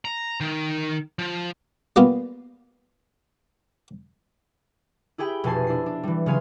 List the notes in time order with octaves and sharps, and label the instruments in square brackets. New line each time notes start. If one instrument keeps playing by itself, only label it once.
[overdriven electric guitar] A#5
D#3
F3
[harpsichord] G3 A#3 B3 F4
[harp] E4 G4 G#4 G5 B5
F1 B2 G#5 A5 C7
D4 E4 C7
D4
E3 G3
C#3 F#3 B3 F5 G#5 C6